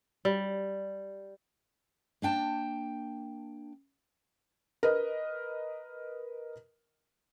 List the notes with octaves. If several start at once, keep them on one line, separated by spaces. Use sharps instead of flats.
G3
A#3 D4 G5 A5
A#4 B4 D#5